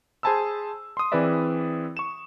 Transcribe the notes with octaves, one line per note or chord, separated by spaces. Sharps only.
G#4 C5 G#5 A5 B5 E6
C6 D#6
E3 C4 G#4 B4 D5 E5
C#6 E7